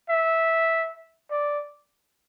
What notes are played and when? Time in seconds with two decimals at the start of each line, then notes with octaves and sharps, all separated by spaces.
0.09 E5
1.31 D5